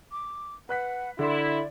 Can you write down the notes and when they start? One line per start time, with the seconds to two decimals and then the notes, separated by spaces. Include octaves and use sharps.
0.11 D6
0.69 B4 F#5 F#6 B6
1.19 D3 E4 D5 C6